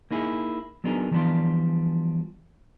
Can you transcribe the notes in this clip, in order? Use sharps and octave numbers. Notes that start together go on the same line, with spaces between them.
A#3 D#4 E4 G#4
F#3 B3 D4 D#4 G#4 A#4
E3 F3 G3 B3 D4 F4